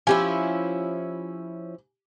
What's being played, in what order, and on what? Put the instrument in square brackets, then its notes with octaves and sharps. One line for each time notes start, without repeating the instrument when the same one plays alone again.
[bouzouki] F3 C#4 E4 [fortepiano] G4 G#5